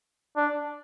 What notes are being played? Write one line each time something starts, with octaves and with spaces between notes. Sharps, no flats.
D4